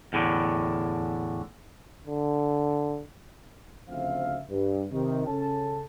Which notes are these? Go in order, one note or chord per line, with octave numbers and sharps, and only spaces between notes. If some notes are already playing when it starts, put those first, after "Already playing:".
E2 A2 D3
D3
D2 C#3 F3 C4 E5 F5
G2
C3 D#3
C#3 C#4 A4 A5